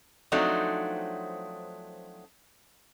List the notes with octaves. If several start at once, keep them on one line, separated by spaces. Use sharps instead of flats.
F3 F#3 A3 C4 D4 D#4